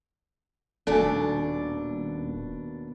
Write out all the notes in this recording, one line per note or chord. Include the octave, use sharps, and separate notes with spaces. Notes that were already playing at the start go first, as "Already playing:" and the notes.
D#1 D#2 B2 D4 A4 G#5